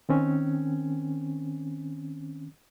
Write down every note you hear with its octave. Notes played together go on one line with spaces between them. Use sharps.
D#3 C4 C#4